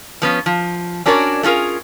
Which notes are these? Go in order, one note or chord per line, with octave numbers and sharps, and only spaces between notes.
F3 B3 C#4
F3
C#4 D4 F#4 A#4 C#5 D5
A3 C#4 F4 G#4 A#4